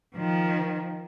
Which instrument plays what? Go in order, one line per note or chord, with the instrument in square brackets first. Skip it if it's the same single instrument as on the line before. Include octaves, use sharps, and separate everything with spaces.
[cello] D#3 F3